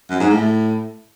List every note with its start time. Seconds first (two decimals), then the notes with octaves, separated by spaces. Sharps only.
0.10 F#2
0.20 G#2
0.30 A2